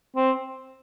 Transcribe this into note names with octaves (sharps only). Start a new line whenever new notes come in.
C4